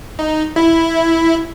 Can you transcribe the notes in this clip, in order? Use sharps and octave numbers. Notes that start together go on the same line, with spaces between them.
D#4
E4